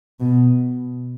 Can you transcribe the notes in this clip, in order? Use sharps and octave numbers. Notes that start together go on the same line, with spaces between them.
B2